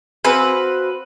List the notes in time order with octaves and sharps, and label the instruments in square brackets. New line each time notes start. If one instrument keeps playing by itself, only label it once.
[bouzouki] C4 F#4 F5 [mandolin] B4 [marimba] G#5